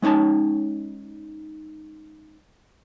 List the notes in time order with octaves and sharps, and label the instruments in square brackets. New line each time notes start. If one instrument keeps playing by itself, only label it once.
[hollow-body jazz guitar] G#3 C#4 D#4 C#5 A5